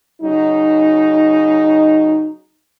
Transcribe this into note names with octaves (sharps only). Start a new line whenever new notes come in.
C#3 F#3 D#4